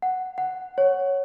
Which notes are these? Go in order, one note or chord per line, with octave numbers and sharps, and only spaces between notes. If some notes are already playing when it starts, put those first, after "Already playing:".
F#5
F#5
C#5